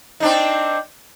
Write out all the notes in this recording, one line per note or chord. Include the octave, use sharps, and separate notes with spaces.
C4 D4 D#4